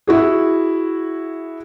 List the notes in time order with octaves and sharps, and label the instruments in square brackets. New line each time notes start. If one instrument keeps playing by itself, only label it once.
[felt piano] E4 F#4 G#4